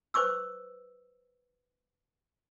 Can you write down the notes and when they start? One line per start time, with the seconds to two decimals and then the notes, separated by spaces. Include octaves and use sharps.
0.14 B4 C5 C#6 D6 E6